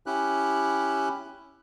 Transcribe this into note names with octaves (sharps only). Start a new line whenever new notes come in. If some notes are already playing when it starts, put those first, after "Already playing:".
C#4 E4 G4 F#6